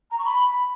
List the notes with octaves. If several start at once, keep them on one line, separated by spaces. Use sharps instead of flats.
A#5
C#6
B5